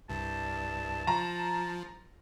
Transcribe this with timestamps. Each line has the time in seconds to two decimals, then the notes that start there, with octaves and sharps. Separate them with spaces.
0.09 C2 G2 A5
1.07 F3 A#5